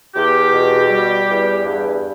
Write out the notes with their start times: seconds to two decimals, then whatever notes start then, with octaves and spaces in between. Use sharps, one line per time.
0.14 E2 G4
0.52 B2
0.90 G3
1.28 E2
1.65 G2